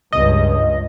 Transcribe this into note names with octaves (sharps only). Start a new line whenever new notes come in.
C#2 G2 D#5